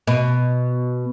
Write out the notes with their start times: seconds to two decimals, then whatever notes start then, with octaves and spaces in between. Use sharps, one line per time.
0.07 B2